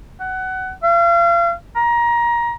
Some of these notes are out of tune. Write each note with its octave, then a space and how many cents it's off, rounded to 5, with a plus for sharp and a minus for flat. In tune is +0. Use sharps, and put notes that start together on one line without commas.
F#5 +20
F5 -40
A#5 +20